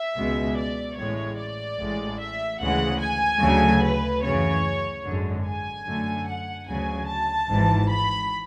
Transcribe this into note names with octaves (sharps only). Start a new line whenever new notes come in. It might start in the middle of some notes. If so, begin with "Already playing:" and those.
Already playing: E5
C#2 B2 G#3
D5
A1 A2 G#3 C#5
D5
A1 A2 G#3
E5
D2 C#3 E3 G#3 F#5
G#5
D2 C#3 F#3 A3
B4
F#2 C#3 E3 C#5
G#1 F#2 D3 G#3
G#5
F#2 D3 A3
F#5
D2 C#3 F#3 G#5
A5
G#1 G#2 E3
B5